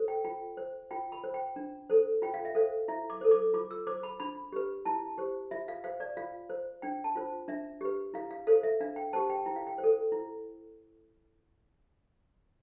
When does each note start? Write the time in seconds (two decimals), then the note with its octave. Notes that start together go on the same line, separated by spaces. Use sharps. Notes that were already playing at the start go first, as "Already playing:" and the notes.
Already playing: A4 C5
0.08 G5
0.24 F4 G5
0.57 C5
0.91 F4 G5
1.12 B5
1.24 C5
1.34 G5
1.56 D4
1.90 A4 C5
2.22 F4 G5
2.34 F5
2.45 E5
2.55 A4 C5 F5
2.88 E4 E5
3.10 D6
3.21 A4 C5
3.31 D6
3.54 F4 D6
3.71 E6
3.87 C5 D6
4.03 B5
4.20 D4 B5
4.52 G4 B4
4.85 E4 A5
5.18 G4 C5
5.51 F4 E5
5.68 F5
5.84 C5 F5
6.00 D5
6.17 F4 F5
6.50 C5
6.82 D4 G5
7.04 A5
7.16 F4 C5
7.48 D4 E5
7.81 G4 B4
8.14 E4 F5
8.31 F5
8.47 A4 C5 F5
8.63 E5
8.80 D4 F5
8.96 G5
9.13 G4 C5 A5
9.30 G5
9.46 E4 G5
9.56 F5
9.67 G5
9.78 C5
9.84 A4
10.12 E4